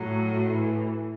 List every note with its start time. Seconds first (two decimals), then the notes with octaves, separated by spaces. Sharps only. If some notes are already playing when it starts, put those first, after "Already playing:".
Already playing: A2 F#3
0.48 E3